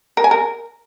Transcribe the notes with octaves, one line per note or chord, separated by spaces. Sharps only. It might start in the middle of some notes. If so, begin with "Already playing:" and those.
A#4
G#5
A#4